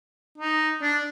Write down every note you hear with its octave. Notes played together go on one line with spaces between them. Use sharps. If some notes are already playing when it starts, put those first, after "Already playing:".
D#4
D4